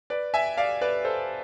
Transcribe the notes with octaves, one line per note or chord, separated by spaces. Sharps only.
B4 D5
E5 G#5
D5 F5
B4 D5
A4 C5